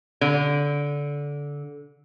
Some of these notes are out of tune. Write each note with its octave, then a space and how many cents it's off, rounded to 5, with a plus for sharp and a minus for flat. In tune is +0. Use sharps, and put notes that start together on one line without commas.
D3 -20